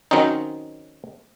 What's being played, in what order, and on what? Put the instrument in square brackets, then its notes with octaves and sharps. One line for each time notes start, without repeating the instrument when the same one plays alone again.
[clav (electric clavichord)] D#3 F#3 C4 C#4 D#4